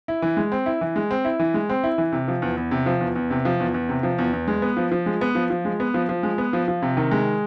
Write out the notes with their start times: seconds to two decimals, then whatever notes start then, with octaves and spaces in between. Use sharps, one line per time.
0.08 E4
0.22 E3
0.37 G#3
0.52 C4
0.66 E4
0.81 E3
0.96 G#3
1.11 C4
1.25 E4
1.39 E3
1.54 G#3
1.69 C4
1.84 E4
1.98 E3
2.12 C3
2.28 F3
2.42 E2
2.57 E2
2.71 C3
2.86 F3
3.01 E2
3.16 E2
3.30 C3
3.45 F3
3.60 E2
3.74 E2
3.89 C3
4.03 F3
4.18 E2
4.33 E2
4.48 G#3
4.62 B3
4.77 F3
4.92 F3
5.06 G#3
5.21 B3
5.35 F3
5.50 F3
5.65 G#3
5.80 B3
5.94 F3
6.09 F3
6.23 G#3
6.38 B3
6.53 F3
6.68 F3
6.82 C3
6.97 D#3
7.11 G#3